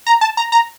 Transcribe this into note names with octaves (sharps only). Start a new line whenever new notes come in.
A#5
A5
A#5
A#5